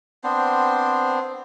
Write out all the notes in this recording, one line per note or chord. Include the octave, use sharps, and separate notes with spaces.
B3 C4 D4 C5